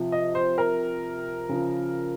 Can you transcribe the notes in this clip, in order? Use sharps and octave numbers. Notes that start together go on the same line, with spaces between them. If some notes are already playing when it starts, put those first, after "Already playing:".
Already playing: C3 F3
D#5
C5
A#4
C#3 F3